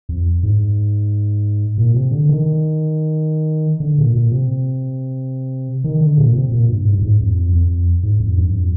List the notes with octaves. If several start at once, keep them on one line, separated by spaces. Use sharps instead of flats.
F2
G#2
A#2
C3
D3
D#3
D3
A#2
A#2
C3
D#3
D3
A#2
C3
A#2
G2
G#2
G2
G#2
F2
F2
G#2
F2
G2
F2